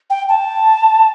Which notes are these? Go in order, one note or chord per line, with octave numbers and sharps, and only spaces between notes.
G5
A5